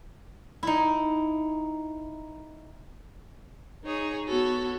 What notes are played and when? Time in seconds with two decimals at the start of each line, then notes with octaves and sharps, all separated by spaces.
0.63 D#4 E4
3.84 D#4 G#4 C#5
4.26 B3 F#4 A4 C#5